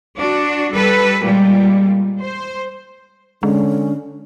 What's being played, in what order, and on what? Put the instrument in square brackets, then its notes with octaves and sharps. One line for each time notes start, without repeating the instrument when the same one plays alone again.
[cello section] D4 F#4
G3 A4 B4
A#2 G3 G#3
C5
[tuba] D3 [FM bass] G#3 [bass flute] C#4